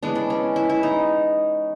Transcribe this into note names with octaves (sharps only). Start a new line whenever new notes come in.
C#3 E3 G#3 B3 D4
D4
C#4
E4
E4
D#4